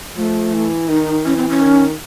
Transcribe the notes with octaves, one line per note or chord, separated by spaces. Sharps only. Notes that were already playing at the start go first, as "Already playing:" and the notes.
F3 A3
E3
D#3 D#4
E3 C#4
C4
C#4
D#3